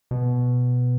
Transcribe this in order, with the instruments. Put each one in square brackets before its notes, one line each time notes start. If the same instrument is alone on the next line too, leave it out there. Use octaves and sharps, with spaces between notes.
[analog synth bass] B2